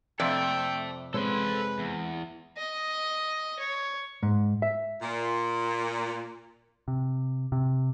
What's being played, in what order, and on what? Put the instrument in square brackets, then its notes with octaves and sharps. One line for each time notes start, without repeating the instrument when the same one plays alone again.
[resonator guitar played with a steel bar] F2 C3 D5 [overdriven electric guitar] A4 E5 [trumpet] G5
[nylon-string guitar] G#3 C4 C#5 [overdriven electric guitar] A4 C6 [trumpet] B4
[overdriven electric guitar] E2
[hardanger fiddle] D#5
C#5
[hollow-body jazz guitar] G#2
E5
[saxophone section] A#2
[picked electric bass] C3
C3